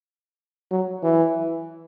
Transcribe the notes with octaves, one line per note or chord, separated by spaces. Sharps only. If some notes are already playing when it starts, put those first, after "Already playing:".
F#3
E3